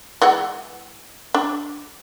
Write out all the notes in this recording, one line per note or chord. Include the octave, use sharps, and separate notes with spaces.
E3 G#3 F#5
D4